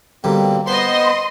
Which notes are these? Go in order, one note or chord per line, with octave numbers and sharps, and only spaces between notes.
B2 D3 G3 A#3 C4
B3 B4 C5 D#5 C6